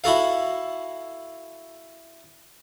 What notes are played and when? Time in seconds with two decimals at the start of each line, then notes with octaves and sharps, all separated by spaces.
0.04 E4 F#4 A4 F5